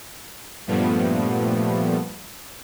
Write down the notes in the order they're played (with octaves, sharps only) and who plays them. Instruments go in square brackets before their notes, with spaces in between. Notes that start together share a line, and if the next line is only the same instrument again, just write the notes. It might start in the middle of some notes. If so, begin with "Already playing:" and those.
[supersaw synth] G2 A#2 F3 G3 A3 B3